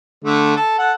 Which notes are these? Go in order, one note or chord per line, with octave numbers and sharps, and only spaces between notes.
D3 A3
A4
A4 F#5